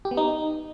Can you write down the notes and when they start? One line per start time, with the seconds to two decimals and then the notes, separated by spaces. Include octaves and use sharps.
0.05 G4
0.11 B3
0.17 D#4